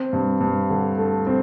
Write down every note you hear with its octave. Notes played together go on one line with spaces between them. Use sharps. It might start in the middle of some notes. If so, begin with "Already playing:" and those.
Already playing: C4
G2
G2
D3
A3
C4